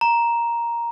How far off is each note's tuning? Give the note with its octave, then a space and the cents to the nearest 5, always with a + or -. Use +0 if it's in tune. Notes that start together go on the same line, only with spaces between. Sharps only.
A#5 +5